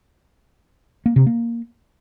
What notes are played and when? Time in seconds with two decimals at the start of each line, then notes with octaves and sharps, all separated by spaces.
1.06 A#3
1.16 C3
1.26 A#3